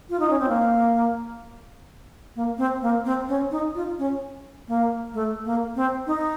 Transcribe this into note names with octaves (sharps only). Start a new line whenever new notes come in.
F4
D#4
C#4
C4
A#3
A#3
C4
A#3
C4
C#4
D#4
F4
C#4
A#3
A3
A#3
C4
D#4